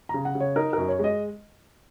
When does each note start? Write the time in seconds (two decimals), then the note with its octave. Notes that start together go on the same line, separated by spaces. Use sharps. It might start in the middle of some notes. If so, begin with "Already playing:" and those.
0.09 C#3 A#5
0.25 F#5
0.35 C#3
0.40 C#5
0.56 D#4 A#4
0.73 F#2 A#4
0.88 C#5
0.99 G#3 D#5